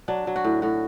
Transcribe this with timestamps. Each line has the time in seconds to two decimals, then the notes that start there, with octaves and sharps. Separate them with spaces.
0.08 F#3 D4
0.27 F#3
0.36 F#4
0.45 A2
0.62 A2 F#4